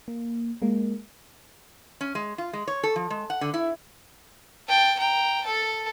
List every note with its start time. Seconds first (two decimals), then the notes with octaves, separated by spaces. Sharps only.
0.08 A#3
0.62 G#3 A#3
2.01 C#4
2.15 G#3
2.38 F4
2.53 G#3
2.68 C#5
2.83 A4
2.96 F3
3.10 G#3
3.30 F#5
3.41 D3
3.54 E4
4.69 G5 A5
4.98 G5 A#5
5.44 A4 A5